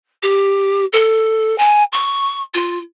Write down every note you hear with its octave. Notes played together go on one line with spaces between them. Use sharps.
G4
A4
G#5
C#6
F4